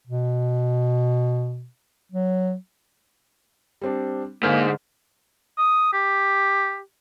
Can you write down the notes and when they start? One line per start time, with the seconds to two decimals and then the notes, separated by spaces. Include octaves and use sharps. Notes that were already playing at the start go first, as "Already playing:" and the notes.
0.07 B2
2.12 F#3
3.81 G3 C4 D4
4.43 G#2 D3 A#3 F6
5.58 D#6
5.93 G4